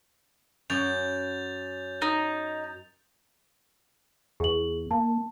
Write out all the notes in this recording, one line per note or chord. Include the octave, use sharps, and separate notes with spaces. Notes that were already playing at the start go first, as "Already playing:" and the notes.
F#2 G6 A6 F7
D#4
E2 G#4 F#7
A#3 A5